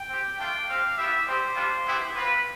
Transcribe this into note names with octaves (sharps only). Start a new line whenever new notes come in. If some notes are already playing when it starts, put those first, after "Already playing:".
Already playing: G5
C4 G4
A3 D4 F4 G5
C4 G4 F5
B3 E4 G4 E5
G3 C4 G4 C5
G3 D4 F4
B3 E4 G4
C4 F4 B4